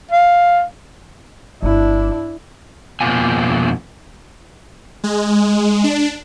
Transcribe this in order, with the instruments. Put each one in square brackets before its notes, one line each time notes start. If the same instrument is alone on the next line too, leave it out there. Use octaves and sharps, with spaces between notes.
[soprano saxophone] F5
[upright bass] G1 [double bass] D4 E4
[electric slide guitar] F2 B2 A#3 C4 F4 G#5
[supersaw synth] G#3
D4